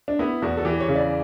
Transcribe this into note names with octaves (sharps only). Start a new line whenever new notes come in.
D4
B3 E4
E2 F#4
A4
E3 G4
C#5
C#3
D5